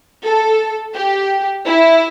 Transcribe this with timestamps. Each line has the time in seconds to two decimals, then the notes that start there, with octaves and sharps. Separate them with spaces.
0.23 A4
0.94 G4
1.65 E4